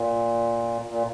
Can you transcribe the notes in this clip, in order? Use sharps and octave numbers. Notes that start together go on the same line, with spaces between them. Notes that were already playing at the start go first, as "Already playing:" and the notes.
Already playing: A#2
A#2